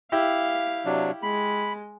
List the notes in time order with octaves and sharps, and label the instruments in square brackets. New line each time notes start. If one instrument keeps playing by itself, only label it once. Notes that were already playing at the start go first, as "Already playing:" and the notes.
[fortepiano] E4 G4 E5 [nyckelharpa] F5
[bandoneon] C3 F#3 D4
[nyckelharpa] G#3 [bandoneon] B5